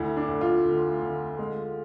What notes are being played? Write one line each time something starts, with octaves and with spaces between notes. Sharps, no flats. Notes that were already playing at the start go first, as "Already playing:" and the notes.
Already playing: D2 E4
D4
D2
F4
D3
D3
G#3